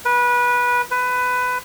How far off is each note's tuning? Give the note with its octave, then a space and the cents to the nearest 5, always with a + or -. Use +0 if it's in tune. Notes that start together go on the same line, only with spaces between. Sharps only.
B4 -20
B4 +15